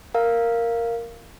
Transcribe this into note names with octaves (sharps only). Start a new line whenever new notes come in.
A#4 F5